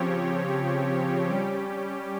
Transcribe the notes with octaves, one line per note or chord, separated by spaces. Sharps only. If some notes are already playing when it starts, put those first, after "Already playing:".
Already playing: C#3 F3 C4 G4 C#5
G3 C#4 G4